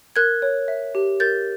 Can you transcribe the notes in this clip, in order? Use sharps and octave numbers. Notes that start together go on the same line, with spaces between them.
A#4 F#6 G#6
C#5
E5
G4
A#4 G6 A6